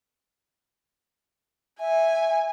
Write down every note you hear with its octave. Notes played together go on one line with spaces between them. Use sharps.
E5 G#5